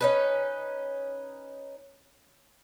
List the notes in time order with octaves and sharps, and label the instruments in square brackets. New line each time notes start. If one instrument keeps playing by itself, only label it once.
[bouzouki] C#4 D#4 B4